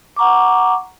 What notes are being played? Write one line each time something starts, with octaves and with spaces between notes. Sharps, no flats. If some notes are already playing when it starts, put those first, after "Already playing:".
F#5 A#5 C#6 D6